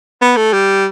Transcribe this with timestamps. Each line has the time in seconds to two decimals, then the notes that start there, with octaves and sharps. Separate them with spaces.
0.22 B3
0.37 A3
0.53 G3